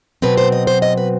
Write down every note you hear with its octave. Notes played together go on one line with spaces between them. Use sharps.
B2 F#3 C4 B4
C5
D#5
C5
D#5
B4